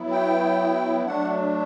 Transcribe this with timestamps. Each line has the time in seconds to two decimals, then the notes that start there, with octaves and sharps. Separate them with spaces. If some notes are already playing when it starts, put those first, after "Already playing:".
Already playing: F#3 B3 E4
0.11 G5
1.06 F#3 A3 D4 F#5